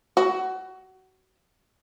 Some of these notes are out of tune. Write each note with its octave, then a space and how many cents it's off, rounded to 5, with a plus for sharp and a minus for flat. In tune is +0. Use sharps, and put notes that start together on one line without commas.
F#4 +25